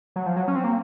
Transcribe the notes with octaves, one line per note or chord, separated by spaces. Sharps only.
F#3
F3
F#3
C#4
C4
A#3